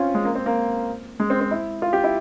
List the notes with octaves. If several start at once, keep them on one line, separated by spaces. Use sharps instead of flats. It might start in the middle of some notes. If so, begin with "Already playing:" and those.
Already playing: C4 C#4 F4
G#3
A#3
C4
A#3
G#3
C4
C4
E4
F4
G4
E4